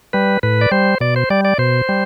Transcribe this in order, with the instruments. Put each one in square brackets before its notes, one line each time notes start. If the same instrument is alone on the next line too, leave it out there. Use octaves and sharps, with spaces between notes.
[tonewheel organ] G3 B4
A2 B4
D5
G3 C5
B2 D5
C5
G3 D5
D5
B2 C5
G3